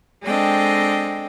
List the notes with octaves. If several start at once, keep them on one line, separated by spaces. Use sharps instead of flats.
G#3 C4 D4 A4 D#5 G5